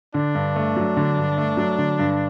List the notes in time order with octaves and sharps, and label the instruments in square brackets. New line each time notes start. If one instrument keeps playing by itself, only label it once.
[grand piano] D3 [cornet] D4
[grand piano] G2
A3
F#3
D3
G2
A3
F#3
D3
G2